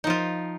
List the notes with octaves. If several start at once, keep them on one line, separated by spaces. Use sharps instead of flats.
F3 D#4 F4